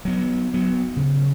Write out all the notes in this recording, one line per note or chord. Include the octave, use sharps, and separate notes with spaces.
F#3 B3
F#3 B3
C#3